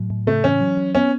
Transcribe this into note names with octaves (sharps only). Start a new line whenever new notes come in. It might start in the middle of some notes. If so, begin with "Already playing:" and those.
Already playing: A2 F#3
A2
C#3 A3
E3 C#4
F#3
F#3
B3 C#4